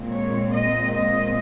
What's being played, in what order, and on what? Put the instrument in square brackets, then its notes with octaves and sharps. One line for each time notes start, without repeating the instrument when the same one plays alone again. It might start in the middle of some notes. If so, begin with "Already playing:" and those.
Already playing: [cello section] A#2 G#3 C4
C#5
D#5
D#5